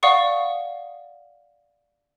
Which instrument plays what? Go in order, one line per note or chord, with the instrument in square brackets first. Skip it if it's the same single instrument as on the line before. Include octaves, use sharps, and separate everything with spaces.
[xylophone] D5 F5 F#5 C#6 D#6